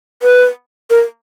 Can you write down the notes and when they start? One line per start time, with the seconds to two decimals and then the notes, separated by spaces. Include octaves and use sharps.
0.23 B4
0.90 A#4